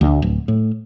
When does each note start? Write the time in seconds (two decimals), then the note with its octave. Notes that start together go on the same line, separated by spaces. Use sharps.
0.01 D2
0.22 D1
0.48 A2